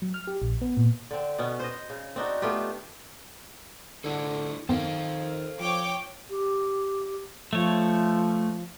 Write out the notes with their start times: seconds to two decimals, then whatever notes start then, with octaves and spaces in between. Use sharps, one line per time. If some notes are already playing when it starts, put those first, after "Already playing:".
0.02 F#3
0.14 F6
0.27 G4
0.42 A#1
0.61 B3
0.77 A#2
1.11 D3 C4
1.38 B2 B3 C#4
1.60 C5 D#5
1.90 C#3
2.16 C4 D4 D#4 F#4
2.42 A3 B3 F4 G4
4.04 D3 E4 G#4 A4
4.69 F#2 D#3 B3 C4 A4 C5 F5
5.60 F3 C#5 G5 D6
6.30 G4
7.53 F3 A3 C#5